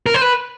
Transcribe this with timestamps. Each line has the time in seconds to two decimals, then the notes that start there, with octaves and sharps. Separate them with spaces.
0.06 A#4
0.14 C5
0.21 B4